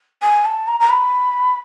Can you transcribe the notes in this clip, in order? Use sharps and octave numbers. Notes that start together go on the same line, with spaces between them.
G#5
A5
A#5
A#5
B5